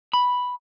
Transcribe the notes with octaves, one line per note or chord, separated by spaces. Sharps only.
B5